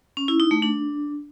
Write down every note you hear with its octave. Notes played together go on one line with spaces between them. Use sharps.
C#4
E4
D#4
A3
D4